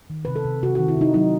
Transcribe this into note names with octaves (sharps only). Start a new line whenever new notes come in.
D#3
C3 B4
A4
C3
C3 F#4
D#3 F#4
E4
C3 D#4
F#3 D#4